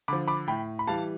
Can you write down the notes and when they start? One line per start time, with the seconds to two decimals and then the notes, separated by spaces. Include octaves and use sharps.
0.08 D3 F3 B5 D6
0.28 B5 D6
0.48 A2 G5 B5
0.79 B5
0.87 E3 G3 F5 A5